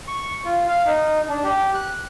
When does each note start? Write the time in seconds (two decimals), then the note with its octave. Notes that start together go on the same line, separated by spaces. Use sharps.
0.07 C#6
0.45 F4
0.68 F5
0.86 D#4
1.29 D4
1.44 G4
1.74 F#6